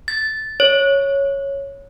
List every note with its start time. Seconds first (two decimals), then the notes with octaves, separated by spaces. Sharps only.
0.08 A6
0.60 C#5